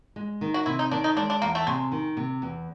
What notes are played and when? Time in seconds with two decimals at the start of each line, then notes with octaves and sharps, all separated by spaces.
0.16 G#3
0.41 D#3
0.54 F#4
0.66 C3 E4
0.79 D#4
0.91 D#3 D4
1.04 D#4
1.17 G#3 D4
1.30 D4
1.42 E2 A#3
1.55 A3
1.67 C3 G#3
1.92 D#3
2.17 C3
2.42 E2